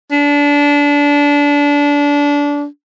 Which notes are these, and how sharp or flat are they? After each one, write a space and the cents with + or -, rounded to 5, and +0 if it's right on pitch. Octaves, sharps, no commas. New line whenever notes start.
D4 -25